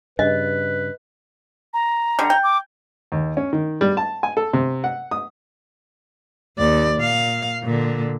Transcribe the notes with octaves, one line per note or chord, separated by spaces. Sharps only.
G2 C#3 B4 D#5
A#5
D3 G3
G5
D6
D#2
C#4
D#3
G3
A5
G#5
A4
C3
F#5
D#6
D#2 D5
A#2 F5
A#2 D3